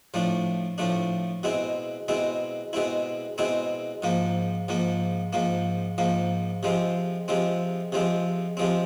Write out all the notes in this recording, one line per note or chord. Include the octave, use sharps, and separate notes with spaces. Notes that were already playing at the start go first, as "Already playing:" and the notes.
A2 F3 A3 D4
A2 F3 A3 D4
B2 G#3 C4 E4
B2 G#3 C4 E4
B2 G#3 C4 E4
B2 G#3 C4 E4
G#2 F3 A#3
G#2 F3 A#3
G#2 F3 A#3
G#2 F3 A#3
C3 F3 G#3 C4
C3 F3 G#3 C4
C3 F3 G#3 C4
C3 F3 G#3 C4